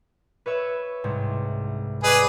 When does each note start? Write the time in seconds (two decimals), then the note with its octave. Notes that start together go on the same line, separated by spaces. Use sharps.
0.46 B4 C#5 E5
1.04 C2 G#2
2.03 G#4 B4 D5 D#5